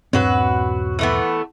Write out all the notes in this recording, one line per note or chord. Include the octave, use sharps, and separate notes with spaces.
D#1 G2 F#3 C4 F#4 B4
E3 A3 B3